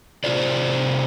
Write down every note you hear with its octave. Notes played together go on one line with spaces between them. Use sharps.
C3 F4 G#4 C5 D5